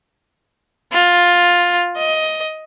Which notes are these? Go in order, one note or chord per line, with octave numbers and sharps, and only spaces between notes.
F4
D#5